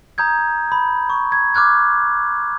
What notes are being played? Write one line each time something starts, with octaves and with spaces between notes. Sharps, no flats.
A#5 D#6 G6 G#6
B5
C#6
G#6
D6 F6 F#6 G#6